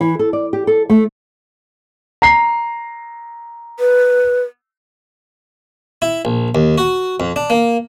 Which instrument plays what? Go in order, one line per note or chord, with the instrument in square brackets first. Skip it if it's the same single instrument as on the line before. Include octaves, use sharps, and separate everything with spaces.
[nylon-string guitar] E3
A4
D5
G4
A4
A3
[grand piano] A#5 C7
[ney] B4
[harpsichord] E4
A#1
D#2
F#4
F2
D4
A#3